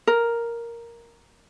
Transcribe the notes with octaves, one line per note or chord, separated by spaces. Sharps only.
A#4